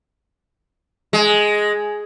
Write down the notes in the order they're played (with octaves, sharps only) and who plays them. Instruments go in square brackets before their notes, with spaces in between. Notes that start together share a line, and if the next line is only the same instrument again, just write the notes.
[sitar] G#3